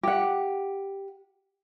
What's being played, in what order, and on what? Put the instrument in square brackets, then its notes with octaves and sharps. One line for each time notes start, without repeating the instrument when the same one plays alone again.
[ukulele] G4 F#5